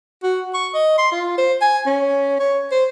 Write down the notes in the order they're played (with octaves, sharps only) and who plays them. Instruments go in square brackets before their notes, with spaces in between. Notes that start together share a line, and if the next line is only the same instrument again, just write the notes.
[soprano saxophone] F#4
C#6
D#5
C6
F4
C5
G#5
C#4
C#5
C5